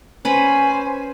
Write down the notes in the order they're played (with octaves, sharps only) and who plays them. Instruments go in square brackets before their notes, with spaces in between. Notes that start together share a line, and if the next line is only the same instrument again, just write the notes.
[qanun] C#4 B4 B5 [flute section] C5 G#5